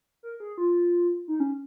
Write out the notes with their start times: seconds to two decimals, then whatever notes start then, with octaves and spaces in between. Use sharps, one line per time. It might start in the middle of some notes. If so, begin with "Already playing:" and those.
0.23 A#4
0.40 G#4
0.58 F4
1.28 D#4
1.40 C#4